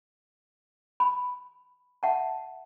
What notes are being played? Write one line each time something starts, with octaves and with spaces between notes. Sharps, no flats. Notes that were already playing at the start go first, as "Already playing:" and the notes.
B5
E5 F#5 A5